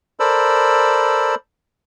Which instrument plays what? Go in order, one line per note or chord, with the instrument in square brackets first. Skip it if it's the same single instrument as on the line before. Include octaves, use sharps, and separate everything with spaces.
[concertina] A4 A#4 C5 D5 B5 E6